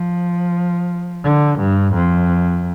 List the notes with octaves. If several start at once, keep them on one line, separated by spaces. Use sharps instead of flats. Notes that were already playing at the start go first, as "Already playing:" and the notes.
Already playing: F3
D3
G2
F2